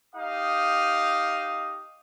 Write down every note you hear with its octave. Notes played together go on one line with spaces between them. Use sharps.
D#4 G4 F5 D#6